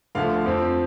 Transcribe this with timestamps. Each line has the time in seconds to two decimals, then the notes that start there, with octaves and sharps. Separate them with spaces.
0.15 D2 D3 F3 A3 F5
0.44 F2 F3 C4